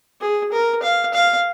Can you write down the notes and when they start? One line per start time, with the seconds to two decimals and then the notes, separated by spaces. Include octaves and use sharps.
0.21 G#4
0.52 A#4
0.83 F5
1.14 F5